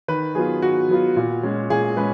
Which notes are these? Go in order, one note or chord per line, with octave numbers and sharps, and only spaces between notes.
D#3 B4
F#3 B3 F4 G#4
D#3 F#4
F#3 B3 F4
A#2
G#3 C#4 F4
A#2 G#4
G#3 C#4 B4